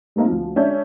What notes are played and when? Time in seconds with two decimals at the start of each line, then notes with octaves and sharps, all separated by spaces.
0.16 G3 A3 A#3 C4 D#4
0.28 D2 F3
0.56 G#3 C#4 D4 E5 G6